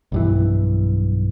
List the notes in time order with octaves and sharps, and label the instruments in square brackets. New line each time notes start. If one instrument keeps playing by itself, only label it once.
[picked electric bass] B1 G2 E3